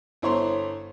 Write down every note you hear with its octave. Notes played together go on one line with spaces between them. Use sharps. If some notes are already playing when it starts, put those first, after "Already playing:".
G1 E4 C5 C#5 A#5 C6